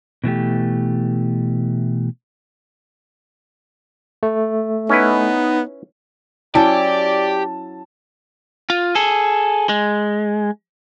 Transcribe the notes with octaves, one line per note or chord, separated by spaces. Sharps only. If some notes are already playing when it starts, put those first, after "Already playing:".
B2 E3 A3 G4
A3
B3 C#4 D#4 E4 B4
F#3 C#4 E4 G4 D5 A5
F4
G#4 A4
G#3